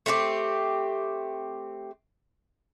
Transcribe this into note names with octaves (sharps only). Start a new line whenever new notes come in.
A3 C4 F4 G4